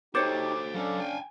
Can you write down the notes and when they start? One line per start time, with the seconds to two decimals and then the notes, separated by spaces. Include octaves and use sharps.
0.15 D#4 F#4 G4 A4 C5 C#5 D6 A6
0.74 F#3 C#4 D4 A4 F5
0.99 G5 G#5